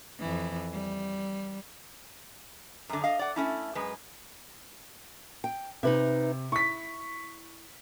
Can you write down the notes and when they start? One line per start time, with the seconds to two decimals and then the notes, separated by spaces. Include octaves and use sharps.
0.20 F2 E3
0.73 G3
2.89 F#2 D3
3.04 D#5 F5
3.19 D5 F#5
3.36 A3 C#4 E4
3.75 F#2 G#3 B4
5.44 G5
5.83 C3 D#4 B4 E5
6.52 E4 C#6 B6